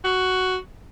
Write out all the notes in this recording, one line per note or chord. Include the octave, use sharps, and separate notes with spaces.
F#4